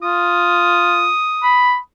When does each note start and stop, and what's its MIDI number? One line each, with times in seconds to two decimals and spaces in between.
0.03 1.11 65
0.03 1.81 87
1.43 1.77 83